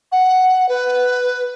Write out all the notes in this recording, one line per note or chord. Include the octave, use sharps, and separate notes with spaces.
F#5
B4